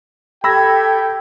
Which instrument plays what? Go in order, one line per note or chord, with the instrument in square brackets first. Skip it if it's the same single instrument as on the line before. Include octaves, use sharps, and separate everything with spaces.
[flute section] G4 A4 G#6 [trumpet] G5 [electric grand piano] B5 E6 A#6